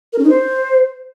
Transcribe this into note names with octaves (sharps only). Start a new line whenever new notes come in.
A#4
C#4
D#4
C5